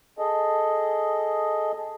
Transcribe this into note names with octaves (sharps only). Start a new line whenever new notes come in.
G#4 A4 D#5